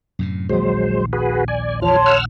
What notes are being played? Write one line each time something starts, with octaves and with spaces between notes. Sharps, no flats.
F#2 A2 C3
A#1 D#2 F#3 G#3 C5
F#4 G#4 B4
D5 G#5
E2 F3 C#5 A5 C6 F6
F#5 E6 F6